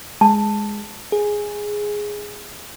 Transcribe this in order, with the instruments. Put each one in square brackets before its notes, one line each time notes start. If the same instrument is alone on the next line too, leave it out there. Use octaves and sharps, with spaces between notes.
[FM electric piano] G#3 [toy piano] A5
[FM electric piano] G#4